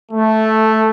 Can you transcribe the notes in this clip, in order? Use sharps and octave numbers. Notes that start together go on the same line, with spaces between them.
A3